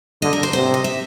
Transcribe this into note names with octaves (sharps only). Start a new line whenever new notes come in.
D3 D#5
A#4
C5
C3 C5
D#5
E5